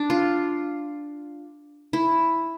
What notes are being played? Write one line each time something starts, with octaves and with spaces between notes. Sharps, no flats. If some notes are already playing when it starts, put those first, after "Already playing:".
Already playing: D4
F4
E4